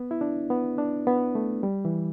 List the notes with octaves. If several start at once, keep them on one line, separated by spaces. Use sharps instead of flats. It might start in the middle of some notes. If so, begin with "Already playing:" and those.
Already playing: B3
E4
D4
B3
D4
B3
A3
G3
E3